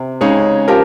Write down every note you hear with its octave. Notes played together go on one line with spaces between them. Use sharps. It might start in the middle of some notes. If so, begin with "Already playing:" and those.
Already playing: C3
C#3 G#3 D#4 G#4 C#5
F3 G4 A#4